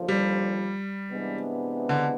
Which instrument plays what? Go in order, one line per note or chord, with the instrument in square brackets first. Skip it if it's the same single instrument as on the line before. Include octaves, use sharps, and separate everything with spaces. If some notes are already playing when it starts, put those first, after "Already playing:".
Already playing: [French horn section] D#2 D3 F3
[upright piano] G3
[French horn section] C3 E3 G#3 B3 D4
[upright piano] D3